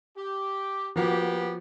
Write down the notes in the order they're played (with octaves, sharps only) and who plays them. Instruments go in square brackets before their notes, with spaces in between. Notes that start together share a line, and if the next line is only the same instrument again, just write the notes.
[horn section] G4
[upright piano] F3 F#4 [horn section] A#3 B3 G4